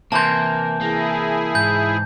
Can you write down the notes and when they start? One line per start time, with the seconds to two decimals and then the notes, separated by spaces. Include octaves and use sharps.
0.12 C3 E3 A#3 A5 C6 G6
0.81 A#3 E4 G#4
1.55 G#2 G6